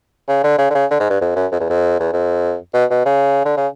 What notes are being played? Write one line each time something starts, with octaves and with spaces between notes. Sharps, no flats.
C#3
D3
C#3
D3
C#3
D3
G#2
G2
F2
F#2
F2
E2
F2
E2
F2
B2
B2
C#3
D3
C#3